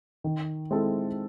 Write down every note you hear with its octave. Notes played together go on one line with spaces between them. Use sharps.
D#3
G#3 C4 E4 A4